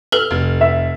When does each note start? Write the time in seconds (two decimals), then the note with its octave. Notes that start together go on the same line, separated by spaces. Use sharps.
0.12 A4 B4 F6 G7
0.31 F1
0.61 E5